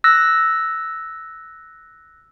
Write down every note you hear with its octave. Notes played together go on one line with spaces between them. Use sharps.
E6 F#6 A#6